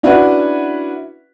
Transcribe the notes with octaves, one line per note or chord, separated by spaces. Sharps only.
C#4 D4 E4 F#4 B4